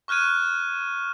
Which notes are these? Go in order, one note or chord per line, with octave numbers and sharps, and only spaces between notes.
C#6 F6 F#6 G#6 D#7